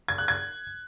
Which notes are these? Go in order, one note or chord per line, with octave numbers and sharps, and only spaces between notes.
G#6
F#6
G#6